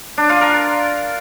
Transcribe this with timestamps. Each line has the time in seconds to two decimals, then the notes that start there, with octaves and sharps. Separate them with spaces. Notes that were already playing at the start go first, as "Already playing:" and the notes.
0.18 D4
0.29 F4
0.41 A#4